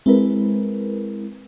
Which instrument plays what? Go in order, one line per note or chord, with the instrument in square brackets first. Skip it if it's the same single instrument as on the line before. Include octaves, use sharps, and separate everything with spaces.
[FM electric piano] G#3 C4 E4 A#4 B4